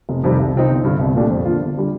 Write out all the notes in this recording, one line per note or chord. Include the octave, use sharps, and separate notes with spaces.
F1
F2 C3 D#3 G3
C2
C3 F3 C4 D#4
G1
G2 D3
C2
A#2 A3 D4 G4
F2
D3 F3 A#3 F4
G1
D3 G3